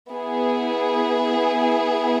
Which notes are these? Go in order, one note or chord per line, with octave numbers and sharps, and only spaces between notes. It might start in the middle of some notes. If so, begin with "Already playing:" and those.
B3 E4 G#4